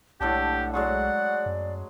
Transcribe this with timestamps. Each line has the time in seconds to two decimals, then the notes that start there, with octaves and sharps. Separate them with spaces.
0.21 B1 A2 D4 G4 F#5 A5
0.74 F#3 G#3 D5 F#5 C#6
1.46 F#2